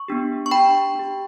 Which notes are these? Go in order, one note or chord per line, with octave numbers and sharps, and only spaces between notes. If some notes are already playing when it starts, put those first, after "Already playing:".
Already playing: C#6
B3 D4 G4
C#6
D4 G4 G5 B5
D4 G4